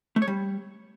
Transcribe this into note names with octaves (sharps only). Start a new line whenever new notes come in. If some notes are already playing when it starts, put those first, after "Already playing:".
A3
C#5
G3